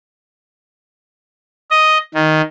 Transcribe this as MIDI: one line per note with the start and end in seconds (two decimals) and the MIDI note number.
1.71 1.98 75
2.15 2.42 51